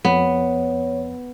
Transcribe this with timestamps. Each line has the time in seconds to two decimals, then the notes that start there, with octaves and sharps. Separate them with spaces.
0.05 F2 B3 C#5